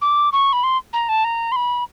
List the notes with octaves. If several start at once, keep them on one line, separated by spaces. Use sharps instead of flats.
D6
C#6
B5
C6
A#5
A5
A#5
C6
B5